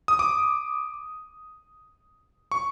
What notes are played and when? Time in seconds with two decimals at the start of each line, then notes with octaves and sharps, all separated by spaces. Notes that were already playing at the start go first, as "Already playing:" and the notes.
0.08 D#6
0.19 D6
2.52 C#6